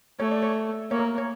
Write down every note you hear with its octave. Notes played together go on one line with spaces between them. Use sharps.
A3 C#5
D5
C#5
A#3 C#5
A#4
C#5